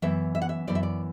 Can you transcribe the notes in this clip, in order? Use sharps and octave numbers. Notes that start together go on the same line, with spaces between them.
F#2 E3 B3 E5
E5
F#5
E5
F#2 E3 B3 D5
E5
D5